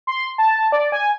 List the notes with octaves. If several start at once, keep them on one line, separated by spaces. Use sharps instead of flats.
C6
A5
D5
G#5